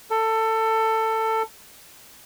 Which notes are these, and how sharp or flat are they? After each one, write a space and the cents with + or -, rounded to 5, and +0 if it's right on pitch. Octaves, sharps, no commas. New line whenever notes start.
A4 +20